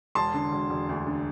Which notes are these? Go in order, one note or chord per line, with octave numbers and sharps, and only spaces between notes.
E1 A5 C6
D3
E1
E1
D2
D3